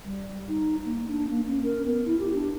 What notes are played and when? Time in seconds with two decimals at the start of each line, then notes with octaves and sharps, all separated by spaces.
0.05 G3
0.49 D#4
0.85 A#3
1.08 D4
1.29 A#3
1.47 C#4
1.63 A#4
1.86 B3
2.05 E4
2.19 G4
2.34 D4